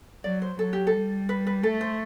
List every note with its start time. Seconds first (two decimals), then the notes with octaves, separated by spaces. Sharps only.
0.24 F#3 D5
0.42 C5
0.59 F#3 A4
0.73 G4
0.87 A4
0.94 G3
1.29 B4
1.47 B4
1.63 A3 A4
1.81 C5